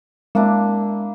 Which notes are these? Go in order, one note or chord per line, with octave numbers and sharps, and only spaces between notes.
G#3 A#3 D4 E4